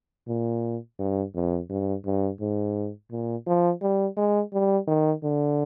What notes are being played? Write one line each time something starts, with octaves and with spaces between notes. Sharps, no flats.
A#2
G2
F2
G2
G2
G#2
A#2
F3
G3
G#3
G3
D#3
D3